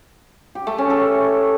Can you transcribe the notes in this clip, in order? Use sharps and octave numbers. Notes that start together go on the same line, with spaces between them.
G4
A3
C#4
A4